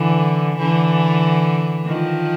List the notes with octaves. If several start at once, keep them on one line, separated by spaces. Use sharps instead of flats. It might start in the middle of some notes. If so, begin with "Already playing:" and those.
Already playing: D3 E3
D3 E3
D#3 F3